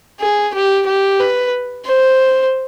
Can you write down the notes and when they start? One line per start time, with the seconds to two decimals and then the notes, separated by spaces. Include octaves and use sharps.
0.20 G#4
0.54 G4
0.86 G4
1.20 B4
1.86 C5